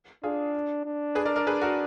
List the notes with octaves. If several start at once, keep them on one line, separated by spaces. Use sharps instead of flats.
D4 F4 G#4
D4
G#4 B4
A#4 D5
A#4 D5
G#4 B4
F#4 A#4